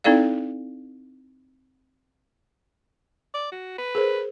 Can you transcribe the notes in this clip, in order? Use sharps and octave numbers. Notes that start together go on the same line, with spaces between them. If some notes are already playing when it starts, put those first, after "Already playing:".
C4 D#4 E4 A4 D5 F5
D5
F#4
B4
G#4 A#4 C5